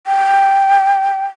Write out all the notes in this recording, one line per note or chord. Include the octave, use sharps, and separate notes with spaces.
G5